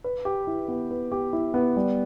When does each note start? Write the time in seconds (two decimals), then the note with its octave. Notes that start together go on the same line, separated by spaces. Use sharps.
0.04 B4
0.25 G4
0.47 E4
0.68 B3
0.91 B4
1.12 G4
1.33 E4
1.54 B3
1.76 G3